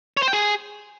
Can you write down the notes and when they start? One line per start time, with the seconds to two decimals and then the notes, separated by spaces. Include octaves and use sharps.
0.17 C#5
0.22 C5
0.28 G5
0.33 G#4